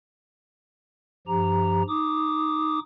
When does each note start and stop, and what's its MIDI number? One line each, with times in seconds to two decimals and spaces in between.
1.28 1.83 43
1.28 1.83 53
1.28 1.83 67
1.28 1.83 82
1.88 2.79 63
1.88 2.79 86
1.88 2.79 87